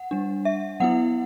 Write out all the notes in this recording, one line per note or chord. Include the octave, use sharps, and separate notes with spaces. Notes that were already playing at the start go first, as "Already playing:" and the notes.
Already playing: F#5
G3 D4
E5
F#3 B3 E4 F#5